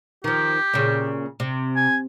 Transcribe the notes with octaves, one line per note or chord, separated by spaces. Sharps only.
D#3 F3 G4
A#2 C#3
C3
G#5